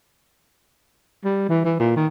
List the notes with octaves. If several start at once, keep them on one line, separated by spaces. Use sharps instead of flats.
G3
E3
E3
A#2
D#3